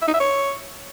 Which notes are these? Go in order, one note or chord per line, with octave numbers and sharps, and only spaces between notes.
E5
D#4
E5
C#5